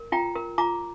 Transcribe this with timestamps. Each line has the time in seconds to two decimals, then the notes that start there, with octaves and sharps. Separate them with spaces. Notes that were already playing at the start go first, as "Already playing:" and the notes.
Already playing: A#4
0.12 F4 G5 A#5
0.35 A#4
0.58 F4 A#5 D6